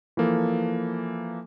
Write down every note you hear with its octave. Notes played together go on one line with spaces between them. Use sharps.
E3 F3 A#3 A4